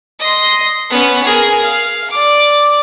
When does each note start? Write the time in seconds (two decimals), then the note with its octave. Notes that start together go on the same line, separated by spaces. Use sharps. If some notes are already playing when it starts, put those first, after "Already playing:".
0.20 D#5 C6
0.90 B3 C#4
1.24 G#4 A#4
1.63 F5
2.10 D5 D6